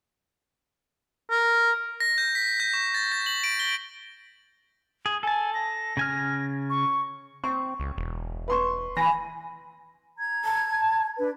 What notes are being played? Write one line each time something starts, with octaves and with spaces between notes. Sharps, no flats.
A#4
A#6
G6
B6
G6
C#6
A6
A6
F#7
D7
G7
G#4
A4 G#5 A5
A#6
C#3 G#5 F6
C#6
C4 C#6
C#2
E1
B4 C6 C#6
E3 G#5 B5 A#6
A#5 G#6
A5
D4 B4